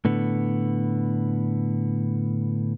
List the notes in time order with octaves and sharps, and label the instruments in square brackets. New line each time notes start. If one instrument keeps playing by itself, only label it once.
[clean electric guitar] A2 D3 B3